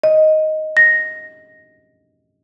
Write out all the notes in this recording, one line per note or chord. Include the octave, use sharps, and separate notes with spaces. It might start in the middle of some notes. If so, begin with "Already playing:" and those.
D#5
A#6